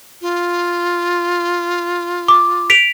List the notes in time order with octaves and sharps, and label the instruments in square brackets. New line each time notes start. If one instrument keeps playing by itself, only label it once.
[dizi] F4
[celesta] D6
B6 D7 F7